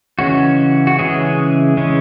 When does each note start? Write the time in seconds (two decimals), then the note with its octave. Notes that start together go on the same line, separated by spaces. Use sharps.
0.19 C#3 E3 G#3 C#4 F#4
0.87 F#4
0.99 C#3 E3 G#3 C#4 G#4
1.77 C#3 E3 G#3 C#4